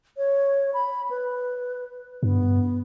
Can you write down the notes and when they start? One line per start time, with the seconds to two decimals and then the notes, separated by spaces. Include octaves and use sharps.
0.17 C#5
0.74 B5
1.10 B4
2.23 G2 B3